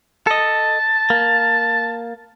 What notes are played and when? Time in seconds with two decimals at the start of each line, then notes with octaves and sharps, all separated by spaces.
0.27 A4 D#5 A5
1.10 A#3